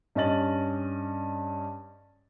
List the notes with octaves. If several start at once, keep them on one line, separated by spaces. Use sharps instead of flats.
G2 C#4 C#5 D#5 A6 F#7